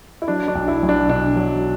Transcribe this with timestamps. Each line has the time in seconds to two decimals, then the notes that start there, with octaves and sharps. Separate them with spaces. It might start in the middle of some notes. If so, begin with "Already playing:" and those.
0.22 E4
0.28 F#3 D4
0.48 D4
0.55 B1
0.68 E4
0.83 B1
0.89 D4
1.09 B2 D4
1.36 F#3